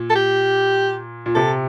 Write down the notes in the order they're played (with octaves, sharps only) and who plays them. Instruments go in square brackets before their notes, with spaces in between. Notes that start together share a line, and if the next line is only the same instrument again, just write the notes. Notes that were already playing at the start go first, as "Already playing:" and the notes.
Already playing: [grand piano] A#2
[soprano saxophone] A4
G4
[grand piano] A#2
[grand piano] C3 [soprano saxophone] A4